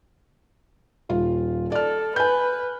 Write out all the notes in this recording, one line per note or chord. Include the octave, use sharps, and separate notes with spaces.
D#1 F4
A4 D5 F6
B4 G#5 G6